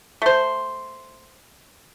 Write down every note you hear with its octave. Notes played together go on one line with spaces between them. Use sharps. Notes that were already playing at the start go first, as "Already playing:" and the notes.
A3 C5